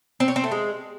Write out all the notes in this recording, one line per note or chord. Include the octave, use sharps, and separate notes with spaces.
C4
C#5
C4
A3
G#3